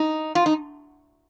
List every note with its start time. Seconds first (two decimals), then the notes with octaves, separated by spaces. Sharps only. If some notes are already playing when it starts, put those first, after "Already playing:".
Already playing: D#4
0.35 F4
0.46 D#4